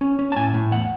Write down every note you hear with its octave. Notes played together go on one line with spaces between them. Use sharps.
C#4
C#4
A5
A2 G#5
A2
E2 F#5